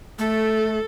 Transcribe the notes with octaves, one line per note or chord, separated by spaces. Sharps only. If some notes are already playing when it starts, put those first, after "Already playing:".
A3 A4